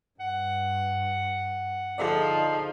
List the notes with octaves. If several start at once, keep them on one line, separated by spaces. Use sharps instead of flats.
G2 F#5
D3 F3 D#4 G#4 A4 D5